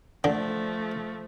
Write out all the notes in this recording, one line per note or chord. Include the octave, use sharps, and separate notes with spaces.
D3 F3 A3